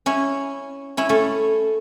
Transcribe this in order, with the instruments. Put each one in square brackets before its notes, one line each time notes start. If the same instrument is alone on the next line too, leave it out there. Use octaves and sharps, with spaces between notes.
[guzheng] C#4 E4
C#4 E4
A3 C#4